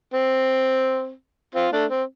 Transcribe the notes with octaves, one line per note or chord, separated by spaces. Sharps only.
C4
C4 F4
A3 D4
C4